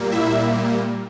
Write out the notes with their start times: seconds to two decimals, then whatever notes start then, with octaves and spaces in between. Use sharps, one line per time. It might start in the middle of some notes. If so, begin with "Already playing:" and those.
Already playing: A#2 G3 A#3
0.11 E4 E5